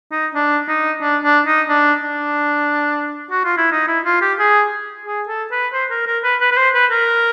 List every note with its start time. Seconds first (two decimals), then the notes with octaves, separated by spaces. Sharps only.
0.11 D#4
0.35 D4
0.68 D#4
1.01 D4
1.24 D4
1.46 D#4
1.69 D4
2.03 D4
3.31 F#4
3.45 F4
3.57 E4
3.72 D#4
3.88 E4
4.05 F4
4.22 G4
4.39 G#4
5.06 G#4
5.28 A4
5.51 B4
5.73 C5
5.91 A#4
6.07 A#4
6.24 B4
6.41 B4
6.52 B4
6.57 C5
6.75 B4
6.91 A#4